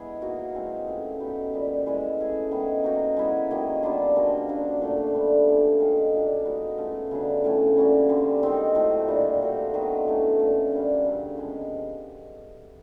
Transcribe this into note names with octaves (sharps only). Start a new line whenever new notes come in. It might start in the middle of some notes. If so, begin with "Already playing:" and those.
Already playing: G#3 B3 E4 G#4
F#3 A#3 D#4 F#4
E3 G#3 C4
A3 C#4 F4
F#3 B3 D#4 G4
A#2 G3 B3
E3 G#3 C#4
A3 C#4 E4 G#4
D#3 G#3 B3 E4
F#3 A#3 D#4 F#4
G#3 B3 E4 G#4
D#3 F#3 A#3
G3 B3 D4 F4
F3 A#3 C#4 F#4
F#3 A#3 D4 F#4
A#2 F3 A3
D3 G3 B3
D3 F3 A#3 C#4
D#3 G#3 C#4 F4
A#2 F#3 A#3 D4
G#3 B3 D#4 F#4
A3 C#4 F4
C#3 F#3 B3 D4
A2 F3 A3 C#4
G3 A#3 C#4 F#4
D3 G3 C4
D#3 G#3 C4 D#4
A2 F#3 A3 C4
A#2 G3 A#3 D4
A3 D4 F#4 A4
D#3 F#3 B3 D4
A2 E3 A3 C#4
A#2 F3 A3 C#4
G3 A#3 D4
C#3 F#3 A3 C#4
C3 F3 G#3 B3